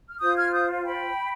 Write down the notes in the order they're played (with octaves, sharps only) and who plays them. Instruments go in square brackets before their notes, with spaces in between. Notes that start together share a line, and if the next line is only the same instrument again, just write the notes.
[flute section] F6
F4 C5 D#6 G6
F6 G#6
D#6 G6
G5 B5